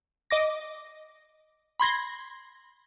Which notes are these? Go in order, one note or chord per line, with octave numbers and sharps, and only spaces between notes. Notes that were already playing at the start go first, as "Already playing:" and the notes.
D#5 D6 A#6
B5 C6 G#6 A#6